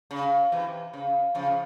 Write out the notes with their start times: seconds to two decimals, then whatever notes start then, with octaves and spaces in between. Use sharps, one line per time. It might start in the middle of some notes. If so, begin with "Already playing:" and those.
0.11 C#3
0.52 C3 E3
0.93 C#3
1.35 C#3 F3